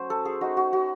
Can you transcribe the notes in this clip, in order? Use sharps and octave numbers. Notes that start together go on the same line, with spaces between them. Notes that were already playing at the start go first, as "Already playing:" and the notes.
Already playing: F#3 A3 C#4 C5
A4
G#4
A3 D#4 F#4
F#4
F#4